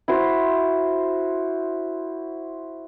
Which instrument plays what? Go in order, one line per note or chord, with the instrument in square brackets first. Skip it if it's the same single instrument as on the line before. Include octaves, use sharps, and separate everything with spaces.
[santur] E4 F#4 C5